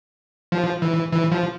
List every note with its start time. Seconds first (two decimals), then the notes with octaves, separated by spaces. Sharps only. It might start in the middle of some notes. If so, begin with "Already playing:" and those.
0.52 F3
0.82 E3
1.12 E3
1.32 F3